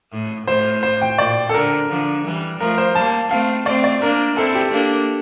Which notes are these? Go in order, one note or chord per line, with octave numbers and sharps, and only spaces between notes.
A2
A2 C5
C5
G5
A#2 D5
A4
D3 A#4
D3 F3
E3 G3
F3 A3 A#4
C5
G3 A#3 A5
A3 C4 F5
A3 C4 D5
D5
A#3 D4 A#4
C4 E4 A4
G4
A#3 D4